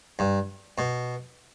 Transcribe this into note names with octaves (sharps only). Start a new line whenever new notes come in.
G2
B2